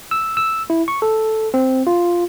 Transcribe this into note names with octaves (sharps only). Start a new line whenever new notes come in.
E6
E6
E4
C#6
A4
C4
F4